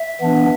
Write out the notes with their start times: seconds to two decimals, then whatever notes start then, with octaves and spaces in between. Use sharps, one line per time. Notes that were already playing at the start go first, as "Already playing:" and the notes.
Already playing: E5
0.21 E3 B3 D4